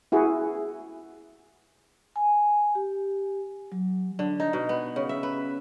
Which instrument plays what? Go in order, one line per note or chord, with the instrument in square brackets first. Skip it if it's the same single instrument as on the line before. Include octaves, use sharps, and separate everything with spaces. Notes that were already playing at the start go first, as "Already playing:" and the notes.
[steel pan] E4 F#4 G#4
[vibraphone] G#5
G4
F#3
[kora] D3
D#4
B2
B3
C#3
E5
B4